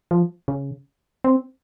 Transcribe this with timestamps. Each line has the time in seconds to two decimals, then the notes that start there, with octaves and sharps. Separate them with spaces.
0.11 F3
0.48 C#3
1.24 C4